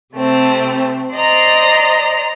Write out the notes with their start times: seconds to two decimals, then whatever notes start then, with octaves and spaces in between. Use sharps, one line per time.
0.14 C3 A3 C4
1.13 C5 D5 D#5 A#5